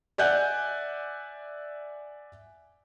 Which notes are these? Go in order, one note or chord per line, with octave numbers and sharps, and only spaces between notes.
D5 E5 F#5 G#5 F#6 G6